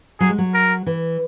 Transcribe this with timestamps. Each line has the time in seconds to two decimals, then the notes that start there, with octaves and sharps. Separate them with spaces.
0.20 F#3 G#4
0.29 G#3
0.38 F#3
0.54 A#4
0.87 E3